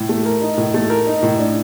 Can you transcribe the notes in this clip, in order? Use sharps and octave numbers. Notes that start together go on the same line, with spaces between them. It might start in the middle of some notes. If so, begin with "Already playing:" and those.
Already playing: A2
A3
A#4
D#4
A2
A3
A#4
D#4
A2
D4